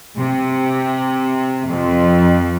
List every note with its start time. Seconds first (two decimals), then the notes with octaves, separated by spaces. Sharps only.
0.15 C3
1.66 F2